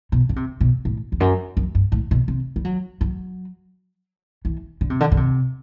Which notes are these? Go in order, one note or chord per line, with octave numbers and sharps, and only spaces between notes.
B2
D3
C3
B2
A2
E2
F#2
F#2
G2
A2
B2
C3
G3
F#3
F#3
E3
D3
C3
D3
D3
C3